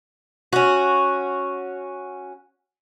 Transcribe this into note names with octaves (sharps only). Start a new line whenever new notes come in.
C#4 F#4